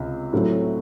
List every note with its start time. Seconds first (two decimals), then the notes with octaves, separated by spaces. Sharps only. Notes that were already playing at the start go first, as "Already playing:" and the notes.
Already playing: C#2 C3
0.33 A2 F#3 A3 C4